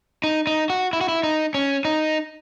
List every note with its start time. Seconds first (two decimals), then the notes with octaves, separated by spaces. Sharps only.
0.24 D#4
0.47 D#4
0.70 F#4
0.93 E4
1.01 F#4
1.09 E4
1.23 D#4
1.54 C#4
1.85 D#4